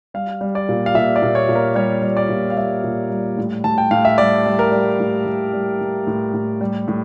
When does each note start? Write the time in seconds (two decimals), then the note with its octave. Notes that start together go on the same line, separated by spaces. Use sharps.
0.14 G3 F5
0.41 G3
0.55 D5
0.69 A#2
0.86 F5
0.95 A#2 E5
1.16 D5
1.22 A#2
1.35 C#5
1.49 A#2
1.55 A#4
1.75 G3 C#5
2.02 G3
2.17 D5
2.29 A#2
2.50 F5
2.57 G3 E5
2.84 A#2
3.10 G3
3.38 A2
3.64 A2 A5
3.78 G5
3.91 A2 F5
4.05 E5
4.18 G3 D5
4.46 G3
4.59 A#4
4.72 G3
5.00 A2
5.26 A2
5.53 G3
5.80 A2
6.07 A2
6.33 A2
6.61 G3
6.88 A2